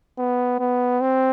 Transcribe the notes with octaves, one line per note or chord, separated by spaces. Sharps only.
B3
B3
C4